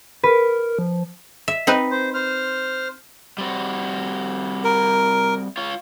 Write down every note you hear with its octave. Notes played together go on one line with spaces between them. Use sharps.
A#4 B4
F3
E5
C4 D#4 B4
C5
C5 F6
G3 C4 F#4
A#4
F4 C#5